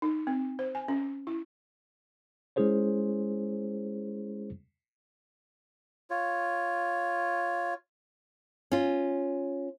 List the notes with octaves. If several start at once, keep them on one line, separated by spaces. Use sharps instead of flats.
D#4
C4
C5
G#5
C#4
E4
G#3 C#4 E4 G#4 C5 C#5
F4 C#5
C#4 F4